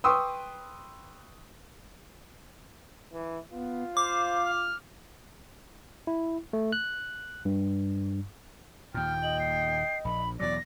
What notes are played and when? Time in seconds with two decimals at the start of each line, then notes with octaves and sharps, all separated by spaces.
0.04 B4 G5 C6 C#6 D#6 E6
3.13 E3
3.52 B3 F4
3.97 C5 F5 D6
4.46 F6
6.07 E4
6.53 A3
6.72 F#6
7.45 G2
8.94 D#2 A#2 G5 F6
9.23 D#5 F#7
9.40 C7
10.05 A#1 B5
10.40 E2 B2 F#3 D5 A#6